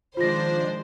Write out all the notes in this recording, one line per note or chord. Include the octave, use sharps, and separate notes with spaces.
D#3 F3 G#3 D4 F4 C5 A#6